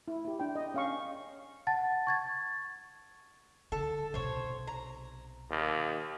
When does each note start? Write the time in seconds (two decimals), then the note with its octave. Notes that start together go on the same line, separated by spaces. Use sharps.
0.08 E4
0.25 E4 G4
0.39 D4 G5
0.56 D#5
0.74 C#4 F5 C#6
1.67 F#5 A5 A6
2.07 C#6 G#6 A6
3.72 D3 A4
4.14 B1 C3 C5 C#5
4.67 A#5
5.50 D#2